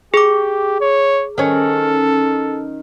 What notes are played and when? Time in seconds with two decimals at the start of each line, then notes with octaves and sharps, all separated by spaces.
0.14 G4 G#4 D6
0.81 C#5
1.38 D#3 C#4 A4